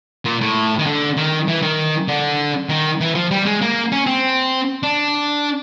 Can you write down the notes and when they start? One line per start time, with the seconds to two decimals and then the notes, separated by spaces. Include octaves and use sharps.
0.25 A#2
0.41 A2
0.79 D#3
0.86 D3
1.17 D#3
1.48 E3
1.62 D#3
2.08 D3
2.69 D#3
3.01 E3
3.15 F3
3.31 G3
3.46 G#3
3.61 A#3
3.92 C#4
4.06 C4
4.83 D4